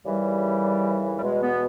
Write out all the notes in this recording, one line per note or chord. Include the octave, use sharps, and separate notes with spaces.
D#2 C#3 E3 G3
G3
E2 B2 G#3
B3